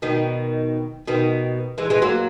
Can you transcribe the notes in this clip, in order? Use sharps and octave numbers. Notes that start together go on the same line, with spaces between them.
B2 D#3
B2 D#3
E3 G#3
E3 G#3
F#3 A#3